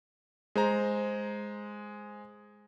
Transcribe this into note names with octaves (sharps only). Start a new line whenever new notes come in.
G#3 C5 A#5